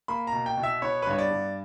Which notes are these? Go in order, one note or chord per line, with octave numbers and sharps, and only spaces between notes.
A#3 B5
A#5
B2
G5
B2
E5
B3 C#5
B4
G2 C#5
D5
G2